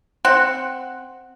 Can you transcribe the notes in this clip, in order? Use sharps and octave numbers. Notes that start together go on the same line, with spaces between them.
C4 F#5